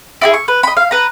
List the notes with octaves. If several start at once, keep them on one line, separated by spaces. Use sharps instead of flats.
E4 F#4 G#4
C#6
B4
D#5 B5
F5
B4 A#5